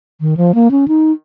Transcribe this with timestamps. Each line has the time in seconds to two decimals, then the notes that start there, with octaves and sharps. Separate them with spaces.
0.21 D#3
0.37 F3
0.55 A#3
0.71 C#4
0.88 D#4